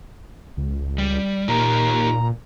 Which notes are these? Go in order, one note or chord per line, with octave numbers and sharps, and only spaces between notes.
C#2
G3
A#2 D#4 G4 A#4 A#5